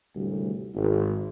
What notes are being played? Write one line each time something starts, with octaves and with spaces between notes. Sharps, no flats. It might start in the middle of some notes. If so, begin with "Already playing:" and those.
G#1 D2 A2 C3 G3
G#1